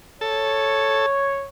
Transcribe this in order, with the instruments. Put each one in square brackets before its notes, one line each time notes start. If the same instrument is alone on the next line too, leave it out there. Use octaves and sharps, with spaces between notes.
[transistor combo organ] A4 [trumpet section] C#5